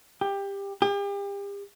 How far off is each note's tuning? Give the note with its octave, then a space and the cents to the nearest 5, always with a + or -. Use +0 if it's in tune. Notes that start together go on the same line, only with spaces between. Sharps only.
G4 +20
G4 +40